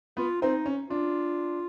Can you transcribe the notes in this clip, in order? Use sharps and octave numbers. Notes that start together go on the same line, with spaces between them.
B3 F4
C4 D#4
C#4
D4 F4